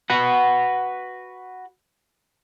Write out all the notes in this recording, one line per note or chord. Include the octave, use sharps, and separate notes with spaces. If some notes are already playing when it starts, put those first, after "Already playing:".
F#4 B4 F#5